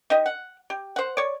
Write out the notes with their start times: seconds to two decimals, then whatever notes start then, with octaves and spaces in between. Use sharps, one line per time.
0.10 D#4 G4 D#5
0.26 F#5
0.70 G4
0.96 C5 F#5
1.17 C#5 D5